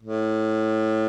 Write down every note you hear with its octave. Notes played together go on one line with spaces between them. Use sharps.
A2